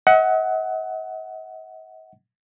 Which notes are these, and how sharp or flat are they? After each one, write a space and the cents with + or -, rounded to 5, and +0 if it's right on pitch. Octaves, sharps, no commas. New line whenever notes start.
D#5 +45 F#5 +10